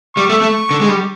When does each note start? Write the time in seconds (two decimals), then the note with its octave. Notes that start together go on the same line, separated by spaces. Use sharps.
0.17 G3 C#6
0.29 A3
0.41 A3
0.71 D3
0.81 G#3
0.89 G3